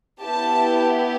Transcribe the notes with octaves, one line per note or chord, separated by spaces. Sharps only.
B3 E4 G4 A5